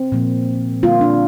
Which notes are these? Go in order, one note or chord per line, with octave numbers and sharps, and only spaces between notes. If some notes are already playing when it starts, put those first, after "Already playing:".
Already playing: C4
A#2 F3 A#3
D3 G3 A#3 F4
D4